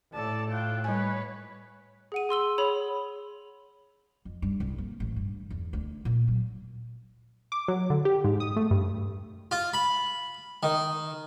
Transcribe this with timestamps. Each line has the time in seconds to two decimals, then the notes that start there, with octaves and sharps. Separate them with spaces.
0.14 A2 A4 D5 A5
0.51 F4 G5 F#6
0.84 G3 B4 C#5 G#5
2.12 G#4 F#5 D#7
2.29 G#4 C6 E6 G7
2.58 G#4 C#5 B5 F7
4.25 F2
4.42 G2
4.60 C2
4.78 A#3
5.00 A1
5.16 G2
5.50 E2
5.73 D2
6.05 A#2
6.28 F#3
7.52 D6
7.68 F#3
7.90 D3
8.05 G4
8.24 G#2
8.40 D#6
8.56 A3
8.71 G2
9.51 F4
9.74 B5
10.63 D#3